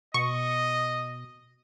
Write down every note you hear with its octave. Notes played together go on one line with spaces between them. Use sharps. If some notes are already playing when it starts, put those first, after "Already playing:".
B2 D#5 C#6